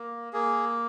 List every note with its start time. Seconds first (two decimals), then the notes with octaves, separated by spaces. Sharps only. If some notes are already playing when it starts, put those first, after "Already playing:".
Already playing: A#3
0.33 A#3 G#4